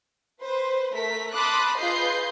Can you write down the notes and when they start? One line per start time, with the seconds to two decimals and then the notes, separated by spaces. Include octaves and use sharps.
0.42 B4 C5
0.94 A3 A#4 B6
1.34 A5 B5 C6 D6 D#6 F#6
1.77 F4 G#4 B4 D#5 G6 C7